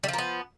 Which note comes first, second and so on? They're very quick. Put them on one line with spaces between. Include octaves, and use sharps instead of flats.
G3 F3 A#3 B3